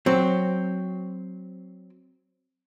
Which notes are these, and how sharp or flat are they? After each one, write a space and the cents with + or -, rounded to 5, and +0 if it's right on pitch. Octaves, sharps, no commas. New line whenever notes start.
F#3 +0 C4 +0